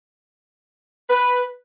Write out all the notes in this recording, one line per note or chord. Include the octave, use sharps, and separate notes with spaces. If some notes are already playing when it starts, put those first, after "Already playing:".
B4